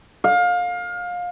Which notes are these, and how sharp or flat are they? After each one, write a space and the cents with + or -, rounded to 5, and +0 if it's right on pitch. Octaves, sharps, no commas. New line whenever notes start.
F5 +25